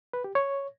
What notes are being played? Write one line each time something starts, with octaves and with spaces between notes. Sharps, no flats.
B4
G4
C#5